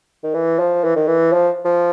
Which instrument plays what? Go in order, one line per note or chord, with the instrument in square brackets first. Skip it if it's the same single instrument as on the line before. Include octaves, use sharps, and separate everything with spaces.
[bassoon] D#3
E3
F3
E3
D#3
E3
F3
F3